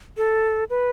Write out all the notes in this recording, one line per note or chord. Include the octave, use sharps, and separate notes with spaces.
A4
B4